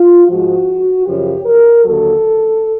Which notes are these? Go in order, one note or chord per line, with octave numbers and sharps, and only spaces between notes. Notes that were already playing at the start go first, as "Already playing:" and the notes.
Already playing: F4
G#2 F3 F#4
F#2 C#3 F3 G4
A#4
D#2 D3 F#3 A4